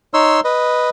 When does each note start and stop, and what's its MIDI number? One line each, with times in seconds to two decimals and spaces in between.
0.14 0.40 63
0.14 0.40 73
0.14 0.40 84
0.14 0.40 88
0.44 0.90 71
0.44 0.90 75